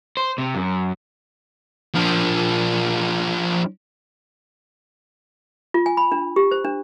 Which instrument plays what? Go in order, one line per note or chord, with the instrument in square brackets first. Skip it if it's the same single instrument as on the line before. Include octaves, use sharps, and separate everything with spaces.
[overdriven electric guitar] C5
C3
F#2
[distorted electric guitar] F3 D4
[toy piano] F4
G#5
B5
D4
G4
C5
D4